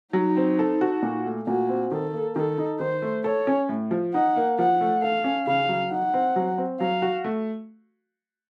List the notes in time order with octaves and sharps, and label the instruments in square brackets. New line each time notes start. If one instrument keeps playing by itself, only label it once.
[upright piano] F#3 [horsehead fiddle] D#4
[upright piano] C4
A4
F#4
A#2
A3
[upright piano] A#2 [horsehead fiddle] F#4
[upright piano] C4
[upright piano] D#3 [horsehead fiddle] A4
[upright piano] A#3
[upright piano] D#3 [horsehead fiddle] A4
[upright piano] D#4
[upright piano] D#3 [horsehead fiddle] C5
[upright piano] A3
[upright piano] A4 [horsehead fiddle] C#5
[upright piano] C#4
A2
F3
[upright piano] D#4 [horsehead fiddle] F#5
[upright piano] A#3
[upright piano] F3 [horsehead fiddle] F#5
[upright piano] A3
[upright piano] A4 [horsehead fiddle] F5
[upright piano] C#4
[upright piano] C#3 [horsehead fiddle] F5
[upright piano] F#3
[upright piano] D#4 [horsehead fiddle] F#5
[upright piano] C4
F#3
C4
[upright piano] F#3 [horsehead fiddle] F5
[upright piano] F#4
A3